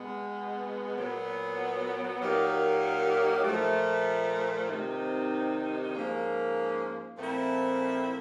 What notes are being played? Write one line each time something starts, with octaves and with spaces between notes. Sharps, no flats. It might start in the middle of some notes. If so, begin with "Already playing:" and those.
Already playing: B2 G#3 B3
A#2 F#3 B3
A#2 F#3 A#3 D#4 G4
A#2 F3 A3
C3 D#3 G3 C4 D#4
G#2 F3 A#3 C#4
A#2 F3 A3 C4 E4